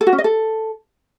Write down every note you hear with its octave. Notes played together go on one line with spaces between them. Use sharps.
A4
F#4
C#4
D#5
A4